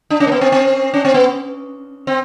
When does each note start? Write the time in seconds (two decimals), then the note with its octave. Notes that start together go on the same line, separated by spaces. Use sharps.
0.10 D4
0.20 C#4
0.27 A#3
0.32 B3
0.41 C4
0.52 C4
0.94 C#4
1.05 C4
1.14 B3
2.07 C4